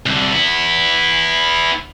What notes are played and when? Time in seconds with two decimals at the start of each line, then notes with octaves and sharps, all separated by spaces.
0.06 C2 D3
0.33 B3 E4